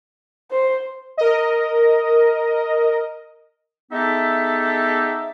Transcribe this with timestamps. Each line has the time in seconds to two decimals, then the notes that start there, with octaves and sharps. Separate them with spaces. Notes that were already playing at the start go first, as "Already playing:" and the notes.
0.51 C5
1.17 A#4 D#5
3.92 G#3 B3 D#4 G4 A4 E5